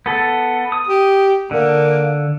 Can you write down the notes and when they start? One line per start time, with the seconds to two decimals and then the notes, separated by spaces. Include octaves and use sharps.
0.06 B3 A4
0.72 D#6
0.87 G4
1.51 D3 A#3